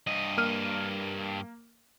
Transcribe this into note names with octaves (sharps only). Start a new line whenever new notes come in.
G2 D#5
A#3 F6 D#7